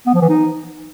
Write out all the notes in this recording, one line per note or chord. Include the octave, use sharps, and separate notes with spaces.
B3
F3
E3
D#4